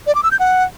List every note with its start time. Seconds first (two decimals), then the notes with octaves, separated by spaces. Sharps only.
0.07 D5
0.15 D6
0.23 E6
0.31 G6
0.40 F#5